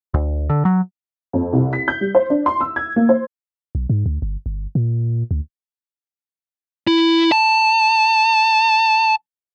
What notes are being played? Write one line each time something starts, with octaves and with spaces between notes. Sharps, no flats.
D2
D3
F#3
F2
C2
B6
G6
G3
C5
D4
C6
E6
G#6
A#3
C5
B1
G#2
D2
G1
G1
A#2
D2
E4
A5